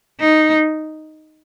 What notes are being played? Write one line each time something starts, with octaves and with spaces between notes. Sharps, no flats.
D#4